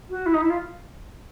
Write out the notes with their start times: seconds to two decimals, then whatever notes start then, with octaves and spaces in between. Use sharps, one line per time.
0.09 F#4
0.25 E4
0.33 D#4
0.41 E4
0.49 F4